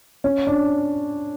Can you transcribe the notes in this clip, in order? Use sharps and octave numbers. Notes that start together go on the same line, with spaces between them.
C#4
D4